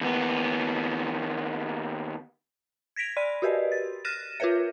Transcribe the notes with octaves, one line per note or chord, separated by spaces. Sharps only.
D#2 B3
G#6 A#6 B6 D7 F7
D5 B5 C6 D#7
F#4 G4 A#4 B4 D5 D#5
A6
F6 F#6 A6 A#6 D#7 E7
F4 A#4 B4 C#5 E5